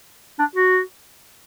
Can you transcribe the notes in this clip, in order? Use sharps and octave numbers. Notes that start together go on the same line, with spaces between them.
D4
F#4